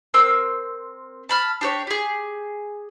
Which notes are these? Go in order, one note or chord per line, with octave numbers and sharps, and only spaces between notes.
C4 A#4 C6 E6
A5 B5 F6
D4 G4 C#5
G4 G#4